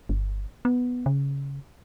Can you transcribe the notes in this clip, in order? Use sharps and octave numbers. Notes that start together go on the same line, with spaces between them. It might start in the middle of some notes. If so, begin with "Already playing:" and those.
G1
B3
C#3